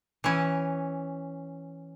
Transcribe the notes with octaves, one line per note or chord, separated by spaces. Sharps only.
E3 C#4